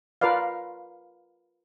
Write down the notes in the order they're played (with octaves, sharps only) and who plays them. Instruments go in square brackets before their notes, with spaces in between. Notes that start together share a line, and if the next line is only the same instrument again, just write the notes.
[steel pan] F4 A#4 B4 D5 F5